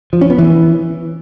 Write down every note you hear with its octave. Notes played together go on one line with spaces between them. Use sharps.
F3
C#4
B3
E3